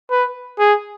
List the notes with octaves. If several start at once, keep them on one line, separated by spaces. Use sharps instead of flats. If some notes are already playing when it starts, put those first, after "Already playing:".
B4
G#4